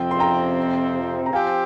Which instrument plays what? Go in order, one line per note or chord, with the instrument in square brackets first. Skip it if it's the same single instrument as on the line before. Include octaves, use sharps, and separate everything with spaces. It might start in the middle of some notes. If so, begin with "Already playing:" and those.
Already playing: [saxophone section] F2 C3 F3 C4 [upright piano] G5
[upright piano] C6
G5 A#5
A#5
[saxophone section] F3 C4 G4 [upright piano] F5 G#5